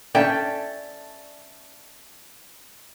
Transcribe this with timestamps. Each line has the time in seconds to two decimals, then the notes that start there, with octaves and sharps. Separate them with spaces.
0.15 C#4 A4 D5 E5 G5